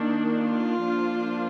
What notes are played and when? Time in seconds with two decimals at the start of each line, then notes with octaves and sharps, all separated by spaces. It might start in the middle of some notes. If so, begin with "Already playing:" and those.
Already playing: D#3 A#3 D4
0.33 F4
0.85 F3 A#3 D4